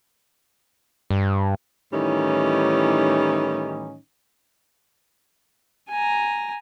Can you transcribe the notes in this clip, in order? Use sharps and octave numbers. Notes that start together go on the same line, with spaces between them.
G2
A2 D#3 E3 G3 C#4 D#4
G#5 A#5